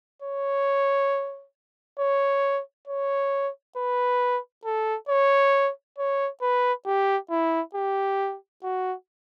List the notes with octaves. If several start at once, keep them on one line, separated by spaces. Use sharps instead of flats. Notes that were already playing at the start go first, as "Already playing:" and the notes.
C#5
C#5
C#5
B4
A4
C#5
C#5
B4
G4
E4
G4
F#4